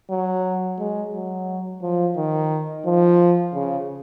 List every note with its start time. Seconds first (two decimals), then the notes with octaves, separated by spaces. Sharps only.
0.10 F#3
0.79 G#3
1.13 F#3
1.82 F3
2.17 D#3
2.85 F3
3.54 C#3